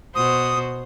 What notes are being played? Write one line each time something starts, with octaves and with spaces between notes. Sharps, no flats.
B2 F#4 C5 D#6